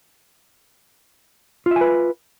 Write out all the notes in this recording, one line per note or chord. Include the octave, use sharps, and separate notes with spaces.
F4 B4 E5 G#5